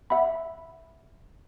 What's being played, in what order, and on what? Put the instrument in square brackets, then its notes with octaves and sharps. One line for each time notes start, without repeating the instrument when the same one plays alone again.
[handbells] E5 F#5 B5